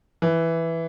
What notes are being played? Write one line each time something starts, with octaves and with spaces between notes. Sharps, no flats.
E3